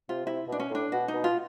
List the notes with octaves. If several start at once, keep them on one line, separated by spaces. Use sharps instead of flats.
C3 F4
C3 E4
B2 D4
C#4
A2 D4
B2 F#4
D#4
B2
F4